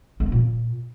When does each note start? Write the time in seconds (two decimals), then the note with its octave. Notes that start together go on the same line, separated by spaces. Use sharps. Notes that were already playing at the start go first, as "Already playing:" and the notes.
0.20 A3
0.26 A#3
0.32 A#2